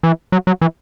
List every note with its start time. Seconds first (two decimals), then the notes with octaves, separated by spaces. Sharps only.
0.03 E3
0.32 F#3
0.47 F#3
0.61 E3